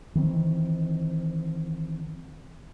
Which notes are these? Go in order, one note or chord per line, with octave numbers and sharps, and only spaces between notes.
D#3 E3 G3 C4